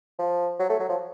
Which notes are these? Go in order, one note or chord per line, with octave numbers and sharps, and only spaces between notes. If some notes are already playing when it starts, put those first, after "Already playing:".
F3
F#3
A3
F#3
F3